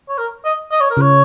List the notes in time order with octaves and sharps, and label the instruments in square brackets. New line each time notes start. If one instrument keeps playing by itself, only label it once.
[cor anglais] C#5
A#4
D#5
D#5
C#5
A#4
[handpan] C#3
[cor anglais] C#5